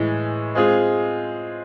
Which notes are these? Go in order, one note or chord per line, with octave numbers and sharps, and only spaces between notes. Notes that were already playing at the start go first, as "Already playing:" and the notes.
Already playing: A2 E3 G#3
G#3 C4 F4 G#4